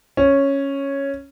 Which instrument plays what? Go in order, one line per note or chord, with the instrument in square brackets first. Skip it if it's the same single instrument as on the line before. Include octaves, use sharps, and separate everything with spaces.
[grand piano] C#4